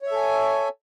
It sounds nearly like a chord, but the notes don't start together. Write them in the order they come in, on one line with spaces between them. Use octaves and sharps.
C#5 E5 A4 G#5